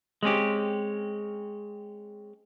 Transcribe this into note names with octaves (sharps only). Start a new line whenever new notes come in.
G#3 C4 C#4 G4